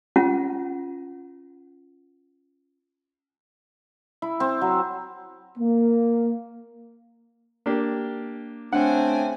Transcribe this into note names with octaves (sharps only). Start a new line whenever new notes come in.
C#4 F4 F#5
E4
C4
F#3
A#3
A#3 D4 G4
C#3 A3 C4 D4 F#5 G#5